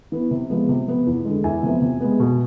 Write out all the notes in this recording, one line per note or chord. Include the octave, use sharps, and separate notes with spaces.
E3 B3
C3
F3 G#3 B3
C3
F3 B3
E2
D3 G#3
E2 E5 G#5
C3 F3 B3
C3
G#3 B3
B2